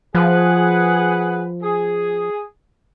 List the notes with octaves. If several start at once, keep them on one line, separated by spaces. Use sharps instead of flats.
F3 G#4 B4 F#5
G#4